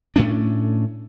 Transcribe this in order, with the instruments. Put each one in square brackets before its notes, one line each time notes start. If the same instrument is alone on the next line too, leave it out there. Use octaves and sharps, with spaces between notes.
[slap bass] A2 A3 C#4 D4